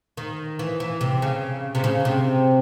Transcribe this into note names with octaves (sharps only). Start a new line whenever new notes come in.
D#3
E3
E3
C3
C#3
C3
C#3
C3